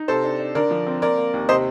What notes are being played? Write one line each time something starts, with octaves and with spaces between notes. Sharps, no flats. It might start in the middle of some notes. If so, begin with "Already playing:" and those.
Already playing: D#4
C3 A4 C5
D4
D4
D3 A#4 D5
F3
C4
A#3 A#4 D5
A#3
D#2
C3 C5 D#5